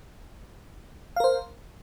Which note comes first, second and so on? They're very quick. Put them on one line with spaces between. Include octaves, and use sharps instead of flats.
F5 A#4 C5